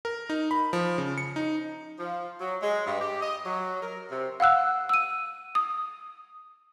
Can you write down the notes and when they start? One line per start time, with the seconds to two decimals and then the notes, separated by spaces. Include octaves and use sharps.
0.05 A#4
0.30 D#4
0.51 B5
0.73 F3
0.98 C#3
1.18 C#7
1.36 D#4
1.99 F3
2.40 F#3
2.62 G#3
2.86 G2
3.00 G4
3.21 D#5
3.45 F#3
3.83 A#4
4.11 C3
4.40 F5 F#5 E6 F#6
4.89 E6 D#7
5.55 D#6